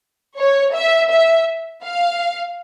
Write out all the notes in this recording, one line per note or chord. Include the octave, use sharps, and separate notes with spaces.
C#5
E5
E5
F5